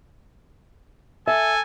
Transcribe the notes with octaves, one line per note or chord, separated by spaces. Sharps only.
A4 E5 G#5